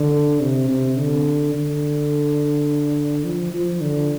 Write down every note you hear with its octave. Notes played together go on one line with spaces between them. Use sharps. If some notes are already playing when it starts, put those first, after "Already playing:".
Already playing: D3
C3
C3
D3
D3
F3
F3
D3